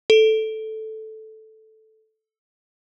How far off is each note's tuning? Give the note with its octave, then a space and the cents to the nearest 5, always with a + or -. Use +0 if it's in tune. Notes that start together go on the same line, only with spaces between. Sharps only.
A4 -5